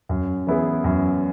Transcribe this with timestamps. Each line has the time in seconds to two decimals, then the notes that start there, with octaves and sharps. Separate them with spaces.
0.09 F#2
0.47 E3 B3 E4 G#4
0.84 F#2